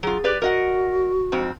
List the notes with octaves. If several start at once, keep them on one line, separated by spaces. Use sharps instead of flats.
F#3 F4 G#4
G4 B4 D5
F#4 A#4 D#5 F#5
F2 G#2 C4